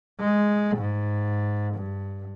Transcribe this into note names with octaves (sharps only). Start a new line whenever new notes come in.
G#3
G#2
G2